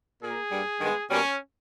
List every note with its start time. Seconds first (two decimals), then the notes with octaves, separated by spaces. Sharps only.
0.22 A#2 A#3 G#4
0.51 G2 G3 A#3
0.80 G2 D#3 G#3 B3
1.09 B2 G3 A#3 C#4